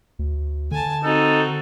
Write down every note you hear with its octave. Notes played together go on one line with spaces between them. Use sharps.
D2
D3 G#5 A5
C4 D#4 F#4 A4